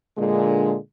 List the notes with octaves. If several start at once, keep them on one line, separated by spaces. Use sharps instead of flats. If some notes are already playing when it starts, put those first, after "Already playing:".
A#2 D3 G#3